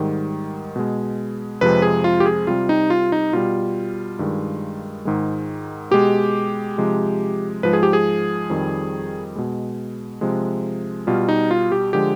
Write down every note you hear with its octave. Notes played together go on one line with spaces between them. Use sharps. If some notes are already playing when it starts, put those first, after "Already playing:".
Already playing: G#2 D#3 G3
B2 G#3
F2 C3 F3 G#3 B4
G#4
F4
G4
G#4
C3 G3 F4
D#4
F4
D#4
B2 G3 F4
G2 D#3 G#3
G#2 D#3 G#3
B2 G#3 G4
C3 F3 G#3
G#2 F3 G#3 B4
G#4
G4
G#4
F2 D#3 G3
B2 G#3
C3 F3 G#3
B2 G3 F4
D#4
F4
G4
D3 F3 G#3 G4